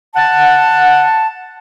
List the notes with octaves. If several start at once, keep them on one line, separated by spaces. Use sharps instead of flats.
F#5 A5